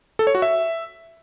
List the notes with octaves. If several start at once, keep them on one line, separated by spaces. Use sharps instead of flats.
A4
C#5
F#4
E5